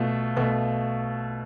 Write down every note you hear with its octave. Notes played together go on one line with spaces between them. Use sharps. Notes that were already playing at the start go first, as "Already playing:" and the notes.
Already playing: B2 A3 F4
B2 A3